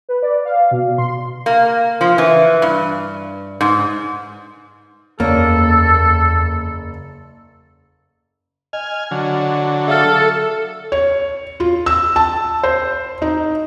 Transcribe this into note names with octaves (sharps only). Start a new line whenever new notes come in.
B4
D5
F5
B2
C6
A#3
F3
E3
G2
G#2
F#1 E2 A#3 A4 C#5 D5
D#5 G#5 F6
D3 F#3
A4 E5 F5 F6
C#5
F4
E6
A5
C5
D#4